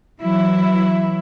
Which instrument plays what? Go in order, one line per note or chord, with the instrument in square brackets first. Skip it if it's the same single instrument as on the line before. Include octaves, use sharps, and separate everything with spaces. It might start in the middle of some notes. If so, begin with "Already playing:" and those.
[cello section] E3 F#3 E4